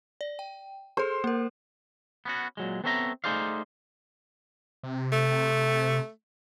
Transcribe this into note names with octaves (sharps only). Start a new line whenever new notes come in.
D5
G5
G#4 A4 C5
A#3 A#4
B3 C#4 F#4
A#2 F#3 G#3
B3 C4 A4 C#5 E5 A#5
A3 D#4 G#4 C5 D5 F5
C3
A3